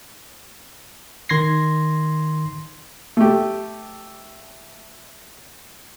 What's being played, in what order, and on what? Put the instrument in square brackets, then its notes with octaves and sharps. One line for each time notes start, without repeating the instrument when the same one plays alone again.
[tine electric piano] D#3 C6 G#6 A#6 C7
[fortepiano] A3 G4